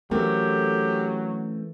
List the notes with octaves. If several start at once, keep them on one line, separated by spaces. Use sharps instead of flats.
E3 F#3 A3 C4 C#4 G4 A4 A#4